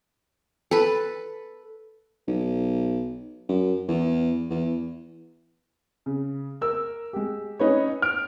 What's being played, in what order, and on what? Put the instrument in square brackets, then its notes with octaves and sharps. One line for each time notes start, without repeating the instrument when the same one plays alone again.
[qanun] A4 B4
[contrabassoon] B1
F#2
E2
E2
[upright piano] C#3
A#4 E6
G#3 G4
C#4 D#4 B4 C#5
F6 D7